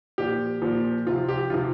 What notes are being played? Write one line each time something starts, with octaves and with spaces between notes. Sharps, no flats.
A#2 F3 G4
A#2 F3
C3 F3 F4
G4
C3 F3 F4